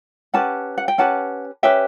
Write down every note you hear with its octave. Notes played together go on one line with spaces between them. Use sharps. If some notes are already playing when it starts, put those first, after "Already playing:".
C#4 G4 B4 F#5 A5
F#5
G5
C#4 G4 B4 F#5 A5
C#4 G4 B4 E5 G5